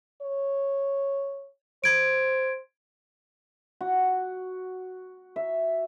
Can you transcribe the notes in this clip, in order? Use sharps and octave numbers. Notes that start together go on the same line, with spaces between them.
C#5
C5 G#6 D7
F#4
E5